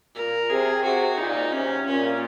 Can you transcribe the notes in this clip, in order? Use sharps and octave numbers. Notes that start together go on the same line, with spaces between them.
A#2 A#4
C3 G#4
C3 F#4
A#2 D#4
C3 C#4
A#2 C#4